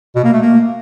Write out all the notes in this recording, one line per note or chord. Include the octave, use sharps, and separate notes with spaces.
B2
A#3
A3
A#3